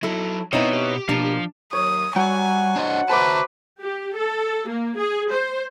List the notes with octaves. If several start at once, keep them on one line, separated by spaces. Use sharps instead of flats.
F#3 D#4 E4 A4
B2 B3 C4 D#4 E4 B4 C#5 D#5
G4
B2 F3 A#3 D4 F5 A5
D#2 F#3 C#5 D#6
F#3 G3 F#5 G#5
D4 C5 D#5
F#4 B4 C5 E5 A5 A#5 D6
G4
A4
A#3
G#4
C5